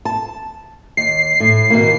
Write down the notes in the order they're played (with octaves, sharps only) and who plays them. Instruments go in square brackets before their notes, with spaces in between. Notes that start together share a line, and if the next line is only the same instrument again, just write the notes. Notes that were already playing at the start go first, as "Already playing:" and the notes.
[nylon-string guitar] A5
[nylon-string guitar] D#2 [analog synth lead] C7
[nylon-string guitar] A2
B2 D#3 A#3